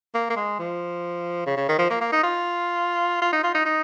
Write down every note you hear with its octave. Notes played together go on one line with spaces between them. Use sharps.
A#3
A#3
G#3
F3
C#3
C#3
D#3
F3
A#3
A#3
D#4
F4
F4
D#4
F4
D#4
D#4